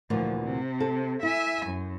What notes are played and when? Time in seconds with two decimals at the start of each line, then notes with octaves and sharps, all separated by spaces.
0.10 D2 A#2 E3 F3
0.43 C3
0.80 A4
1.23 E4 E5 G#5
1.67 F#2